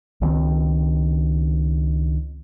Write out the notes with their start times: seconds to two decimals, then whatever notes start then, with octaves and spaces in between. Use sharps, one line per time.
0.21 C#2 D#3 F3 C4